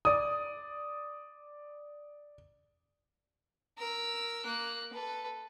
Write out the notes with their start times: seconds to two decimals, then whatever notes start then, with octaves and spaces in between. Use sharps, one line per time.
0.05 D5 D#6
3.78 A#4 E6
4.45 A#3 F#6
4.93 A4 B4